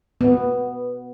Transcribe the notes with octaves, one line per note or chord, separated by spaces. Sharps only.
B3